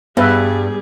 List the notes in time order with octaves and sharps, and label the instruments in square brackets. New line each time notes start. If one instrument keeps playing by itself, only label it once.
[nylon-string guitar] G2 [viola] G3 G#4 [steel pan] B3 B4 E5